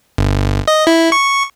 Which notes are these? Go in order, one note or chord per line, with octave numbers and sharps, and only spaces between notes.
G1
D#5
E4
C#6